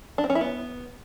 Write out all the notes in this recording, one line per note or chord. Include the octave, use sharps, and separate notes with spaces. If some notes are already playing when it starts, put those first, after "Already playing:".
D4
C4
C#4
E4
B3